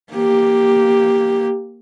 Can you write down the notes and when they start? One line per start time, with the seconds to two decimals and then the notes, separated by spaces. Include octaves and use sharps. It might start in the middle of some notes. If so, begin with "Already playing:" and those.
0.13 A#3 G4